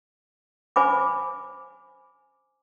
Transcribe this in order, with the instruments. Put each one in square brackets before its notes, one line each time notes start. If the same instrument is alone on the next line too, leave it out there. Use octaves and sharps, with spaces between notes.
[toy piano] C5 G#5 B5 D6